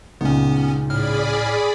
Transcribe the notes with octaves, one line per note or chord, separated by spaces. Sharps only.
C#2 A#2 G#3 B3 C#4 D#4
A2 G#4 D5 B5 F6